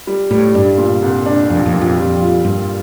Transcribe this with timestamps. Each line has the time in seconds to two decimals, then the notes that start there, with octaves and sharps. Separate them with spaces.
0.07 G3
0.31 A2 G3
0.55 G2 D4
0.78 A#2
1.02 C2
1.26 D4
1.50 F2 A#2
1.66 F2
1.74 A#2
1.82 F2
1.97 G3
2.21 F4
2.45 G2 G3